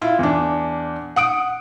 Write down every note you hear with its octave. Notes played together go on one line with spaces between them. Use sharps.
E4 F4
E2 D4
F#5 D#6 D7